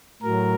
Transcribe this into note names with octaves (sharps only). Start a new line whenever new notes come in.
A2 F#3 A#4